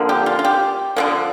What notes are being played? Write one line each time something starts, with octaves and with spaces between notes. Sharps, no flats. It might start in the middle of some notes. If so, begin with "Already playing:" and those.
Already playing: D3 F3 A#3
G4
F4
F4
G4
D3 F3 A#3